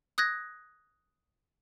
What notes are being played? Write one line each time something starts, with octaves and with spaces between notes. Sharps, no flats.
D#6 F#6 G#6 A#6